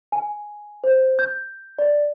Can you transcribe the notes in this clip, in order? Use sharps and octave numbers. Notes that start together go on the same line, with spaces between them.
G#5
C5
G6
D5